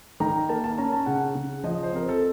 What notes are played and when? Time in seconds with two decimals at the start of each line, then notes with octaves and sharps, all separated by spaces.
0.20 D#3 A#5
0.49 A#3 A5
0.64 A5
0.78 C#4 A#5
0.92 A5
1.06 C#3 F#5
1.35 C#3
1.64 F3 D#5
1.83 C5
1.93 C4 A#4
2.09 A4